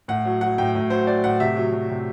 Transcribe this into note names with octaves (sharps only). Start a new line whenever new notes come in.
A2 F#5
F#3
F#3 F#5
A2 G5
A2
F#3 C5
F#3 D5
A2 F#5
C3 E5
F#3
F#3
C3